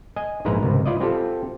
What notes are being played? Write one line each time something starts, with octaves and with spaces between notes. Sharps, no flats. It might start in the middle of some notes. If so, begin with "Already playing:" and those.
D#5 G#5
A#1 G#2 E4 B4 A#5
G#1 C#2 C3
E4 F4 D5 D#5
C4 F4 G4 A4